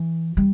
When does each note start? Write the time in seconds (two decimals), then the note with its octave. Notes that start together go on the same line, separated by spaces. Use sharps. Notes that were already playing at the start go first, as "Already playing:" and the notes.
Already playing: E3
0.37 G3